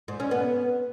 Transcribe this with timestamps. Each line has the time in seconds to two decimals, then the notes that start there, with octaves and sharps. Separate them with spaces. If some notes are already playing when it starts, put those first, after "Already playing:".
0.08 G#2
0.20 C#4
0.31 B3